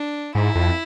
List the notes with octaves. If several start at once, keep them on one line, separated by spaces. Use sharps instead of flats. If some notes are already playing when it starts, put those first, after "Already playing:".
Already playing: D4
G#2 E4
F2